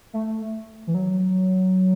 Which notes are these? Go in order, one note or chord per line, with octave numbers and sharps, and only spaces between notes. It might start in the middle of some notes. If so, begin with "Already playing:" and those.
A3
E3
F#3